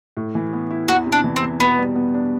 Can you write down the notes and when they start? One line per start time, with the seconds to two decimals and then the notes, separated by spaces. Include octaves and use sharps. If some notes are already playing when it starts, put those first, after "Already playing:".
0.17 A2
0.35 E3
0.53 B3
0.70 E4
0.88 E2 F#4
1.06 C3
1.12 D4
1.24 E3
1.36 C4
1.42 E2
1.60 B2 B3
1.78 G3
1.95 B3
2.14 D4